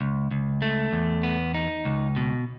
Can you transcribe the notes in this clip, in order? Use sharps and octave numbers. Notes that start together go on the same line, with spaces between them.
C#2
C#2
A3
E2
B3
D#4
C#2
B2